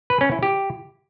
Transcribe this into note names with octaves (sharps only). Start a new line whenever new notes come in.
B4
C#4
E4
G4